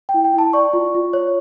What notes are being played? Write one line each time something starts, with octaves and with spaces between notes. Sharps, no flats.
G5
E4
G5
E4 A5
D5 C#6
F4
F4
C#5